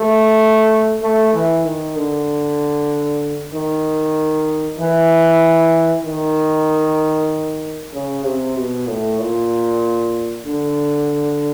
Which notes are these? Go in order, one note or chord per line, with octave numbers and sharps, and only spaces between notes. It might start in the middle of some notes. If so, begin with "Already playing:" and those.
Already playing: A3
A3
E3
D#3
D3
D#3
E3
D#3
C#3
C3
B2
A2
A#2
D3